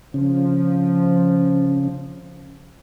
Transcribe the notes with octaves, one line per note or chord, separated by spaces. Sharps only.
C#3 F3